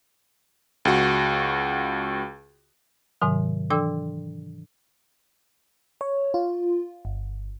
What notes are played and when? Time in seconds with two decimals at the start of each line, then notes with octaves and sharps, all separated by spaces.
0.85 C#2 F#4
3.21 G#2 C3 D#3 F#3
3.70 E3 D4 A4 G5 D6 E6
6.01 C#5
6.34 F4
7.05 G1